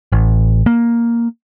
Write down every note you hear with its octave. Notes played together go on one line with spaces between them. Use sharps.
A1
A#3